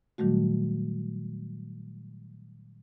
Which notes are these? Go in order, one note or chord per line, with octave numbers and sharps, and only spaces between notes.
A#2 D#3 F#3 G3 A3 F#4